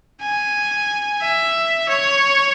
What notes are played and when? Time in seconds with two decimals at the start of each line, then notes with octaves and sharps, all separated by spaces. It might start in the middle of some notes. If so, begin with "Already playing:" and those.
0.22 G#5
1.22 E5
1.89 C#5